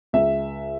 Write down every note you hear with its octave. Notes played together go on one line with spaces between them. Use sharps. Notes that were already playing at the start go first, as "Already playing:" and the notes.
C#2 E5